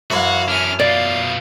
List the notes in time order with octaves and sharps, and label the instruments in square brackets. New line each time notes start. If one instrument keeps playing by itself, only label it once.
[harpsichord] F#2 E3 C6 [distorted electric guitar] F#4 [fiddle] F5 F#5
[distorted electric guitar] C#4 D4 [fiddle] G#5 F6
[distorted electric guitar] B2 F4 [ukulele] D5 [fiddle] F5